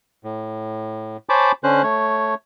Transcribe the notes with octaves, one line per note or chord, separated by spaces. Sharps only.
A2
C5 C#5 G#5 A5 B5 D6
D3 C#4 C5 F#6
A3 C#5